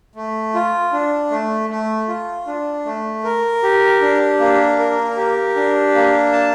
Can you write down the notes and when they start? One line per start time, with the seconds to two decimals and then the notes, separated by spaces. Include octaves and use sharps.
0.15 A3
0.54 F4
0.92 D4
1.31 A3
1.69 A3
2.08 F4
2.47 D4
2.85 A3
3.24 A#4
3.63 G4
4.01 D4
4.39 A#3
4.79 A#4
5.17 G4
5.56 D4
5.94 A#3
6.32 A5